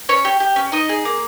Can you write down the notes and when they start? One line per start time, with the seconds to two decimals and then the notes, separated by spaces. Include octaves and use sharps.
0.09 C#4 C#5
0.25 G4
0.40 G4
0.56 C#4
0.72 D#4 D#5
0.89 G#4
1.05 A#3